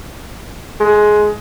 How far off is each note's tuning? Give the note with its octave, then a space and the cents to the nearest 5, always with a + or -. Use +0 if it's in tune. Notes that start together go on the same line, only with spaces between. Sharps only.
G#3 +15